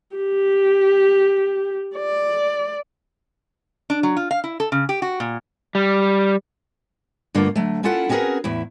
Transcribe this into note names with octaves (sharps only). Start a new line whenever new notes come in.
G4
D5
D4
F#3
F4
F5
E4
A4
C#3
G4
F#4
A#2
G3
G2 D3 A3 A#3 F4
D3 F#3 A3
A#3 C#4 E4 F4 A4 F#5
C4 C#4 F#4 G#4 A#4 B4
E2 A2 E4